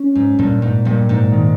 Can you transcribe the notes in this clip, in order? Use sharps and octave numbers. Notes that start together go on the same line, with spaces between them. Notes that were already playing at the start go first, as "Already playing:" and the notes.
Already playing: C#4
G#2
G2 A#2
G#2
G2 A#2
G#2
D#3